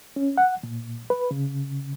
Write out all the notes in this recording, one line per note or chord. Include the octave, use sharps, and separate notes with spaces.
C#4
F#5
A#2
B4
C#3